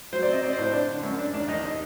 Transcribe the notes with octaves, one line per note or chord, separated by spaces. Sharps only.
F#3 C5
C4 D5
D#5
C4 D5
C5
A2
C5
D4
D3
F#2
D4
D#2 D4
D#2 D#4
D#4